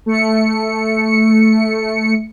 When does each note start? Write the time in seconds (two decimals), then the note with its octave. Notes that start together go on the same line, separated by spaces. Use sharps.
0.06 A3 C#7